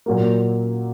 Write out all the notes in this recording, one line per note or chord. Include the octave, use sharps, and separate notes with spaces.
A#2 F#3 A#3